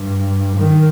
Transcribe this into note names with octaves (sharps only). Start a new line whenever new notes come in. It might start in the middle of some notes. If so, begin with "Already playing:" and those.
Already playing: G2
D#3